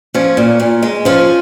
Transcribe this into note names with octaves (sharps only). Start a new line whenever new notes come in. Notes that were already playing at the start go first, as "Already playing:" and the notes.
F3 C#4
A#2
A#2
G#3
F3 C#4 F4